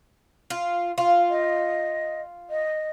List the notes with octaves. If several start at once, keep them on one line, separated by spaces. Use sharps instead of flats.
F4
F4
D#5
D#5